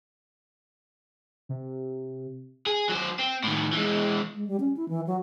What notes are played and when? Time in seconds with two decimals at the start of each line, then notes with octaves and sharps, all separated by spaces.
1.49 C3
2.66 G#4
2.89 F#3 C5
3.19 C4
3.43 A2 D#3
3.73 E3 G#3
4.35 G#3
4.47 G3
4.60 C#4
4.77 E4
4.89 E3
5.07 F#3